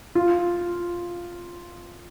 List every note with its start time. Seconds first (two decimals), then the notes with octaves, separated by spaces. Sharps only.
0.15 F4